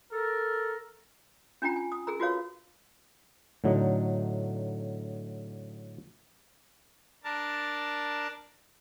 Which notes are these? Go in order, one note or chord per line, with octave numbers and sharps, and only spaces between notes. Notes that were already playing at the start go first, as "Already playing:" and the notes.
A4 A#4
C#4 D4 F4 G5 A#5
G#5
D#6
G#4 A#4 A#5
F4 F#4 B4 C#5 F5
A2 D3 F#3 D#4
D4 A#4 A5